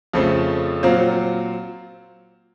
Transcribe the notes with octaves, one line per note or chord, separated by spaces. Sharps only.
F2 C#3 F3 A3 C4
A#2 F#3 C4 F4